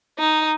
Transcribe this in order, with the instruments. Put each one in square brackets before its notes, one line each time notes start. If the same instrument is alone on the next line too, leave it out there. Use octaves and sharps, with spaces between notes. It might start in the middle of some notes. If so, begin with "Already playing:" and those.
[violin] D#4